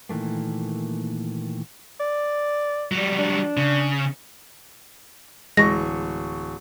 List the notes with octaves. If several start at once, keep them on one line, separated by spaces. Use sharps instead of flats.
A#2 D#3 E3 A3 A#3
D5
F#3 G3
D4
C#3
D1 E3 G#3 C#6 A#6